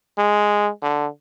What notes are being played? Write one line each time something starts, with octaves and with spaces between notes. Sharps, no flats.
G#3
D3